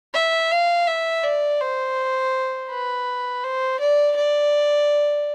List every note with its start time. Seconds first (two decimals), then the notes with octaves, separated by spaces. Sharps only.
0.14 E5
0.52 F5
0.87 E5
1.24 D5
1.60 C5
2.70 B4
3.44 C5
3.80 D5
4.16 D5